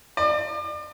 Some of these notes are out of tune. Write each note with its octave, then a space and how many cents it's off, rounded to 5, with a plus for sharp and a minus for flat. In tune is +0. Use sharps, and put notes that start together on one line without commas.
D5 +40